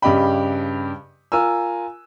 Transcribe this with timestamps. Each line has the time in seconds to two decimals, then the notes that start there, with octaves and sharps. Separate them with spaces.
0.02 G2 C#3 G4 D#5 G5 B5
1.32 F4 A#4 G#5 E6